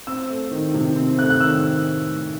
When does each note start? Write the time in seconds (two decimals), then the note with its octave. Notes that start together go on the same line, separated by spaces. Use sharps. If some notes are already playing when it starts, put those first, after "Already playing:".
0.07 C4 E6
0.30 A3
0.51 D#3
0.74 C3
0.96 C4
1.18 A3 F#6
1.30 F#6
1.40 D#3 E6